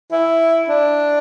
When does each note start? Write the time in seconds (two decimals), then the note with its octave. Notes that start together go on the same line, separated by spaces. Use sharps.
0.12 E4
0.69 D4